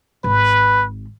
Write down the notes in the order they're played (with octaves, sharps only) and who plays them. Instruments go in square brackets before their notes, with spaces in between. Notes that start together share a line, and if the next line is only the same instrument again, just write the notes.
[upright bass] G#1 [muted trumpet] B4